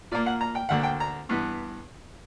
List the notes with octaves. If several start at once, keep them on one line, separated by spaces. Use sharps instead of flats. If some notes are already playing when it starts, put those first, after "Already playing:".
A#2 A#3 D5
F#5
A#5
G5
D2 D3 A#3 F#5
G5
A#5
G2 E3 B3